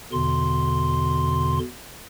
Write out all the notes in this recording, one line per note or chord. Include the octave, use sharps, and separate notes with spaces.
E2 B2 D3 C6